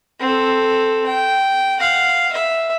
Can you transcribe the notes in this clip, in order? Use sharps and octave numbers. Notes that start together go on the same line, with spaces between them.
C4 A4
G5
F5 F#5
E5